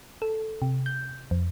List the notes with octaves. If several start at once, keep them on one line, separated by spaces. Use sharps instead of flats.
A4
C3
G6
F2